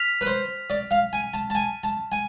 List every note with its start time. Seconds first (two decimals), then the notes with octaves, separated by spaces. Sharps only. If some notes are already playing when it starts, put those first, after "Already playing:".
Already playing: F6 B6 F7
0.21 B4
0.27 C5
0.70 D5
0.91 F5
1.13 G#5
1.34 A5
1.50 A5
1.55 G#5
1.84 A5
2.12 G#5